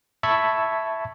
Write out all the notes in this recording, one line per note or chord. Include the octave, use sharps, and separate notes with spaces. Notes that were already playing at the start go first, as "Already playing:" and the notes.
E5 A5 B5 C#6 E6 G#6